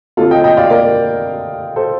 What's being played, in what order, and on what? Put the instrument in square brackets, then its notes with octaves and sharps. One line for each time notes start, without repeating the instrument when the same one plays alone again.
[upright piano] D3 A3 C4 F4 A4
D#5 G5
D#5 G5
D5 F5
A#4 D5
A4 C5